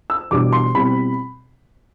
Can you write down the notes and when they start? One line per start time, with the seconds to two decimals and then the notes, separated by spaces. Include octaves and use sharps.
0.10 E6
0.31 E2 B2 G3 D4 D6
0.53 C6
0.75 B2 G3 C4 E4 B5